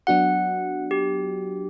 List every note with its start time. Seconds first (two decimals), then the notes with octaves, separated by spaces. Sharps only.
0.07 F#3 B3 D4 F#4 F#5
0.91 G4